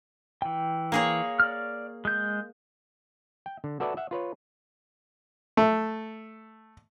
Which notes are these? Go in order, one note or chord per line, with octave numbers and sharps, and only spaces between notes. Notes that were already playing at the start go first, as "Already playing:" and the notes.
E3 G5
A#3 G#4 C#5
D5 F6
G#3 G6
G5
D3
F#4 A4 B4 D5 E5
E5 F#5
F4 B4 C#5
A3